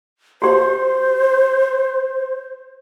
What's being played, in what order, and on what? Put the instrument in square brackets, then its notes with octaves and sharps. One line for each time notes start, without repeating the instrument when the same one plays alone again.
[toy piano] F#4 G4 [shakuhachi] C5